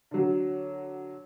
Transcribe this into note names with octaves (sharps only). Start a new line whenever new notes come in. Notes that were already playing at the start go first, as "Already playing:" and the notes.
D3 F#3